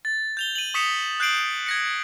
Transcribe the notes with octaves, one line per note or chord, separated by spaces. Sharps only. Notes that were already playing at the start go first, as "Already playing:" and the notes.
A6
G6 F7 G7
D#7 F#7
C#6 D#6 B6 C#7 E7 F7
F#6 G6 C7 D7 F#7
G#6 A#6 C#7